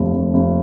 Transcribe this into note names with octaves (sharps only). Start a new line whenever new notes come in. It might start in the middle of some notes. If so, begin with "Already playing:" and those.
Already playing: F1 D#2
F1
F1